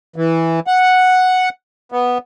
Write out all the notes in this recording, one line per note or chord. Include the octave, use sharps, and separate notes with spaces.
E3
F#5
B3